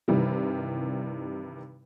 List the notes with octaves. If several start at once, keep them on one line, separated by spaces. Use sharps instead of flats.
G2 C3 D#3 E3 G3